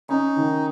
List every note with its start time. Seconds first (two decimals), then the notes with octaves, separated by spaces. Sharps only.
0.09 C#4 D#4
0.36 D#3